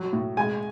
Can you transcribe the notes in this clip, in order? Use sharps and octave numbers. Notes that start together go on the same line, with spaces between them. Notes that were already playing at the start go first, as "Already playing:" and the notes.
Already playing: F#3
A2
G#3 G#5